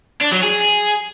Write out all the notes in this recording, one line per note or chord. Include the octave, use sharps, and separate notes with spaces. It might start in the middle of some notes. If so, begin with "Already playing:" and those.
D4
F#3
G#4